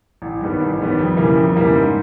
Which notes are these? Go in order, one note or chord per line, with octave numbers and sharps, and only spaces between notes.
A1
G2 D#3 G3 B3
A1
G2 D#3 G3 B3
F2
C#3 E3 G3 A#3
F2
C#3 E3 G3 A#3
G#2